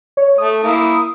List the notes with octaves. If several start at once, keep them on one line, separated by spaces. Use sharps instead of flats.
C#5
A3 D#6
A#3 E4